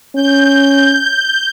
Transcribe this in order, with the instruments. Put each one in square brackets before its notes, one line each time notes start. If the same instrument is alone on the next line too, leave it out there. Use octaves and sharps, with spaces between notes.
[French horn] C#4 [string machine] G6